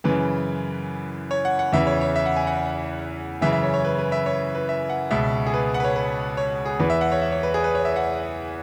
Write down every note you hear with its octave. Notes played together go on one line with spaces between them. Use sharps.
F#2 C#3 E3 B4
C#5
F#5
F#5
E2 C#3 E3 E5
C#5
C#5
E5
F#5
G#5
F#5
F#2 C#3 E3 E5
E5
C#5
C#5
B4
B4
E5
C#5
B4
E5
F#5
C#2 B2 E5
G#4
B4
F#5
B4
C#5
B4
C#5
G#4
E2 E3 B4
E5
F#5
C#5
E5
C#5
B4
G#4
B4
C#5
E5
F#5